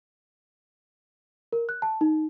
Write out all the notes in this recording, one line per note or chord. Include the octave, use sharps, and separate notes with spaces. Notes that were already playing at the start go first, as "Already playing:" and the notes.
A#4
F#6
A5
D#4